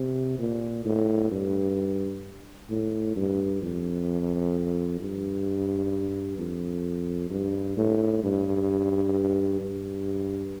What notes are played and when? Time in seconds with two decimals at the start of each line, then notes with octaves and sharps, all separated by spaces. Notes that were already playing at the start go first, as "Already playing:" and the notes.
Already playing: C3
0.39 A#2
0.85 A2
1.32 G2
2.70 A2
3.16 G2
3.62 F2
5.00 G2
6.38 F2
7.30 G2
7.77 A2
8.24 G2
9.61 G2